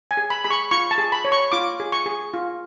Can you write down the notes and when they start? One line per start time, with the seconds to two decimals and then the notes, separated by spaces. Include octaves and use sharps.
0.11 G#5
0.17 G#4
0.30 B5
0.44 G#4 B5
0.50 C#6
0.71 F4 C#6
0.91 A5
0.98 G#4
1.12 B5
1.25 C#5
1.32 C#6
1.52 F4 D6
1.80 G#4
1.92 C#6
2.06 G#4
2.34 F4